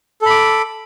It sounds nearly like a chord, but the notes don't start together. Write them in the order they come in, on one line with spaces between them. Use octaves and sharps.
A4 B5 D6